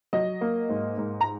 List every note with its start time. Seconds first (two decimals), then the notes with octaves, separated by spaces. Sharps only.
0.13 F#3 D#5
0.41 A#3
0.69 G#2
0.98 G#2
1.21 A#5